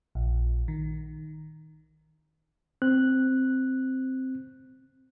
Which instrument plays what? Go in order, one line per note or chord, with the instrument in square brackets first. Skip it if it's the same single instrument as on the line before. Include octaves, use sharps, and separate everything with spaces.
[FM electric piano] A#1
D#3
[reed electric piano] C4 F#6